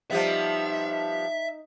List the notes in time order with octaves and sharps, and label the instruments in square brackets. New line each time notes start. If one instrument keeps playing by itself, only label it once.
[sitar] F3 G3 B3 [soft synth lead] D#4 [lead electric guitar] E5